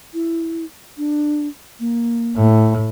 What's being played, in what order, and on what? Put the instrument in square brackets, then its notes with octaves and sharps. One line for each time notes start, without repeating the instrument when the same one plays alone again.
[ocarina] E4
D4
A#3
[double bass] A2